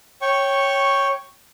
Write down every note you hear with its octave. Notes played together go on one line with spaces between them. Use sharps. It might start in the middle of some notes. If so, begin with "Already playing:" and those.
C#5 G5 C#6